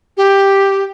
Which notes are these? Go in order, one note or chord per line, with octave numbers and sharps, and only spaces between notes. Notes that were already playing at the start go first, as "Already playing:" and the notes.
G4